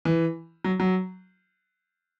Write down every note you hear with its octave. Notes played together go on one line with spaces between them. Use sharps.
E3
F#3
F#3